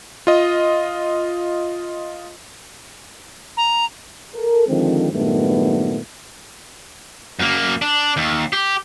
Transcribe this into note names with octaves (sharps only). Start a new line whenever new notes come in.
F4 D#5
A#5
A4 A#4
D3 D#3 F3 G#3 C4
G2 A#2 D#3 F#3 A3 B3
F#2 A#3
D4
D#2
G4